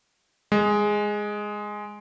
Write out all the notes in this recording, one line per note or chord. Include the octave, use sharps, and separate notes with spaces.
G#3